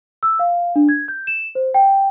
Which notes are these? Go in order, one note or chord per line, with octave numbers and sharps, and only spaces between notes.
E6
F5
D4
G#6
G6
E7
C5
G5